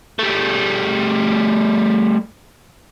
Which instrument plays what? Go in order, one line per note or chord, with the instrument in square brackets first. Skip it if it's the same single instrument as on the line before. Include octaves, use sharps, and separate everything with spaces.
[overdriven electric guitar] G3 A3